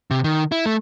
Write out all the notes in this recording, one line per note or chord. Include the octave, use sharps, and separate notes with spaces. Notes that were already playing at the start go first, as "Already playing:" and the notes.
C3
D#3
E4
A3